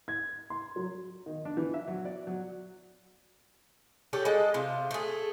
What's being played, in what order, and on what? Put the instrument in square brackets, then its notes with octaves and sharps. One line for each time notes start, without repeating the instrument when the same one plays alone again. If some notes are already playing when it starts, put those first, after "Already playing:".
[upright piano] G#6
C6
F#3
[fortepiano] D#3
D4
E3
E5
F#3
D5
F#3
[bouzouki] D4 G4 A4 C#5
G#3 A4 D#5 F#5
C3 F4
A3 G#4